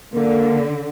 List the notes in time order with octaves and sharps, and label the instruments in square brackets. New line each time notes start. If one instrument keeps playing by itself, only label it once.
[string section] D3 [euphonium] A#3